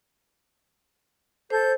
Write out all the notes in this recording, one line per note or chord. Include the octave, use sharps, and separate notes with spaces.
A4 C5 G6